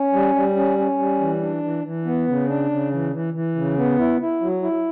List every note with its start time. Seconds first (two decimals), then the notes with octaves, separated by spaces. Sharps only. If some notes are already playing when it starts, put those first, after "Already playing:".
Already playing: C#4
0.13 G3
0.35 G3
0.56 C#4
0.78 C#4
0.99 G3
1.21 E3
1.42 D4
1.63 E3
1.85 E3
2.05 B3
2.28 C#3
2.49 D4
2.71 C#3
2.91 E3
3.12 E3
3.34 E3
3.56 C#3
3.77 B3
3.98 E4
4.20 E4
4.41 F#3
4.63 E4